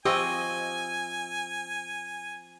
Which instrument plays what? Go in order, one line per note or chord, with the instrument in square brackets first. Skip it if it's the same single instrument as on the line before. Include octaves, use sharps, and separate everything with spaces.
[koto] F3 C4 D#5 [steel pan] G4 G5 [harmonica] G#5 [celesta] C#6 E6